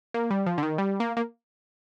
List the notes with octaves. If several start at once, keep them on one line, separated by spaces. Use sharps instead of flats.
A#3
G3
F3
D3
D#3
G3
A#3
A#3